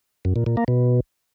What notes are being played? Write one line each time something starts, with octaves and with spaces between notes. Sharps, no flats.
F#2
A#2
A#2
A#3
B2